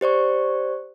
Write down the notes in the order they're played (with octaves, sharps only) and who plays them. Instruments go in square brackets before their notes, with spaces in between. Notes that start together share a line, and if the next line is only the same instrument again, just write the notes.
[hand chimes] G4 C5 D5 C#6